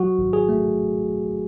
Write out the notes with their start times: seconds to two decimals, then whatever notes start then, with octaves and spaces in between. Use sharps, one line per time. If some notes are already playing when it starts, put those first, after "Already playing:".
Already playing: F#3 F#4
0.19 G#1
0.33 G#4
0.49 A3